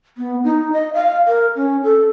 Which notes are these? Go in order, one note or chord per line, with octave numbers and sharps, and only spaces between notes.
B3
D#4
D#5
F5
A#4
C#4
A4